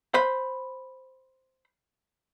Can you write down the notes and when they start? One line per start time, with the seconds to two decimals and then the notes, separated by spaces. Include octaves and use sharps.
0.14 C5 B5